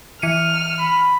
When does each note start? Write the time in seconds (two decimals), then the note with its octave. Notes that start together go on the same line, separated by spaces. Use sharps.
0.22 E3 F6 C#7 D#7
0.79 B5